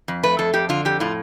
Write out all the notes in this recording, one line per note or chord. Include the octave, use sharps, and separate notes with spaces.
F2
A3 B4
F2 A4
F2 G4
D3 F4
F2 G4
A2 F4